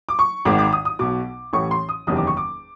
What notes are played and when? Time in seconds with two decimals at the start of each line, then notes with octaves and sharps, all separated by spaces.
0.09 D6
0.19 C#6
0.45 G#1 G#2 D#3 D6
0.58 D6
0.73 D#6
0.85 D#6
0.99 B1 B2 D6
1.53 A1 A2 E3 C#6
1.71 C6
1.89 D#6
2.07 F#1 E2 C3 D#3 D#6
2.17 D6
2.27 C#6
2.37 D6